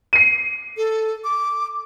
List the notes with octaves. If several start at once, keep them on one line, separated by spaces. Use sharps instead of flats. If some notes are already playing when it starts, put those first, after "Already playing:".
C7 D#7
A4
D6